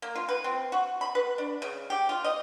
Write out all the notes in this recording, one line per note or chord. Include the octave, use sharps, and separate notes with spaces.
A#3
F4
B4
C4
F#4
B5
B4
D4
C#3
G4
F4
D#5